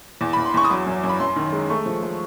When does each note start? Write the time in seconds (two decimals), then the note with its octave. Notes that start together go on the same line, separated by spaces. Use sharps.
0.21 E2
0.33 E2 B5
0.45 C6
0.54 E2 C#6
0.64 D#6
0.70 F#3 D6
0.86 F#2
1.03 F#2
1.09 B5
1.20 F#2 C6
1.36 D#3
1.52 G#3
1.70 A3 C#6
1.86 F3
2.03 A3